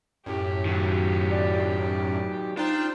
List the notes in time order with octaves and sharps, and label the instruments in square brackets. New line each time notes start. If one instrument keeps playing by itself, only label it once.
[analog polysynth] F#2 A2 [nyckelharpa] G4
[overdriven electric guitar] D#3 F#3
[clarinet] D5
[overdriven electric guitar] D4 [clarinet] D#4 [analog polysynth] F4 G5 [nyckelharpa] C5